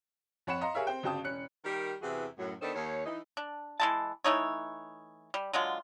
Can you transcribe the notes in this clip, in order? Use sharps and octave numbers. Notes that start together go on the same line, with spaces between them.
F2 C#5 F#5 B5 C#7 E7
D#5 F5 A#5 C6
G4 G#4 A#4 C#5 E5 F5
C4 C5 G5
G1 C#3 F#4 G5 A5 D#6
E1 C#4 F#6 C#7
D#3 G3 G4 A#4
E2 C3 E3 B3 F#4 G#4
F#2 A2 F#3
D#3 B3 D4 D#4 A4 C5
D#2 C#5
E3 D#4
D4
E3 G#3 A5
E3 A3 D#4 C#5
G3
D3 F#3 G#3 F4